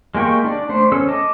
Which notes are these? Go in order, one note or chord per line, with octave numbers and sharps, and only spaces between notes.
G#3 A#3 G4 G5 C#6
D4 D5
A3 D4 C5
C#4 A4 E6
D#5 A5 D6